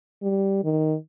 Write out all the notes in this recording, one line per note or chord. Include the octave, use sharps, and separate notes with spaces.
G3
D#3